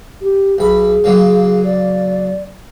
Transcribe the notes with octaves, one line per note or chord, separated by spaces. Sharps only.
G4
B1 G#4 B5
C#3 F#3 A#3
D5